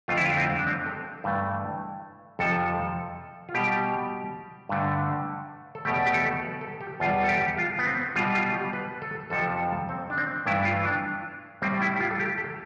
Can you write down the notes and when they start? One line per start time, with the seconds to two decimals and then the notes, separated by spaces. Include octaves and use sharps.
0.08 F2 D3 A3 F4
0.17 E4
0.26 F4
0.37 C4
0.58 D4
0.67 C4
0.86 A4
1.24 G2 E3 A3
2.39 F2 C3 F3 A4
3.49 F4
3.54 B2 G3 G4
4.69 G2 D3 A3
5.75 A4
5.85 E2 B2 A3 G4
6.06 G4
6.14 A4
6.42 B4
6.61 A4
6.81 G4
7.00 E2 B2 G3 F4
7.23 A4
7.29 G4
7.57 F4
7.79 B3
7.87 C4
8.16 B2 G3 F4
8.35 F4
8.54 G4
8.73 B4
9.02 A4
9.30 F2 C3 F3 A4
9.89 C4
10.10 D4
10.18 C4
10.46 G2 E3 A3 E4
10.65 F4
10.85 D4
11.62 A2 G3 C4
11.81 E4
11.94 G4
12.00 F4
12.11 A4
12.19 G4
12.38 A4